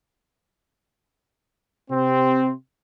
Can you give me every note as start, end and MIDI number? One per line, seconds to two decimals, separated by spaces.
1.91 2.52 48
1.91 2.52 60